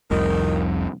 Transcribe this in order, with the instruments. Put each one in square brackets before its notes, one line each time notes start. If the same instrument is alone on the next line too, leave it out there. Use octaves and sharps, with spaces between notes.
[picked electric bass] F1 C2 F2 [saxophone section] D#3